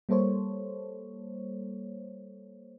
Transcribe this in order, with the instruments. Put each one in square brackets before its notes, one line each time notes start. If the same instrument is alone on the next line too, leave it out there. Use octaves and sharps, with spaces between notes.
[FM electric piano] G3 A#3 A4 C5 C#5